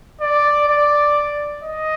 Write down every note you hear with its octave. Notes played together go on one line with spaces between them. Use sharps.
D5
D5
D#5